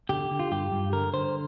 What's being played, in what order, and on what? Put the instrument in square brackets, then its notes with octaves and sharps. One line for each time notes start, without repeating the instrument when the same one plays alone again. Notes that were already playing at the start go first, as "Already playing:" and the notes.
[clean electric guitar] D3 G4
D3
F4
G2 G4
G2
D3 A#4
D3 C5